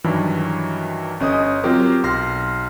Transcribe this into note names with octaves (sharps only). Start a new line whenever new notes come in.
G2 D#3 E3 F#3
G1 C#4 D#5 D#6
F#3 C4 F4 G4 A#4 C5
B1 C6 F6 A#6